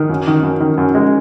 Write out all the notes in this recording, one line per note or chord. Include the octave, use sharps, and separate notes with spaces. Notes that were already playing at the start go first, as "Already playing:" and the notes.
Already playing: D#3
F#2
D#3
F#2
D#3
F#2
G#3